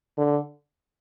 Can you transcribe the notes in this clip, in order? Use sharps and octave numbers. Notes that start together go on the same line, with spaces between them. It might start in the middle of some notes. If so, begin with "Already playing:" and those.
D3